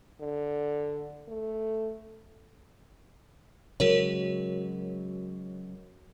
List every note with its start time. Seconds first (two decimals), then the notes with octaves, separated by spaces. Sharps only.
0.21 D3
1.28 A3
3.80 C#3 F#3 G#3 F#4 A#4 C#5